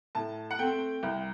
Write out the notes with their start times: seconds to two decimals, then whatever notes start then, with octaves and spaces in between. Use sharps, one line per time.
0.15 A2 A5
0.51 F#5
0.59 A3 C4 G5
1.03 C2